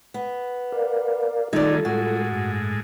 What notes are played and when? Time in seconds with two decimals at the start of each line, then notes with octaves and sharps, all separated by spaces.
0.14 B3
0.72 A#4 D5 F5
1.53 D#3 G3 A3 D#4 F4 G#4 A4 D5
1.85 A2 G#3 F#4
2.32 G2